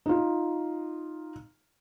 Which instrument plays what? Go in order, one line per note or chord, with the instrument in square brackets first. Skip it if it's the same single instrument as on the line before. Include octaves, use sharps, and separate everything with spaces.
[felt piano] D#4 F4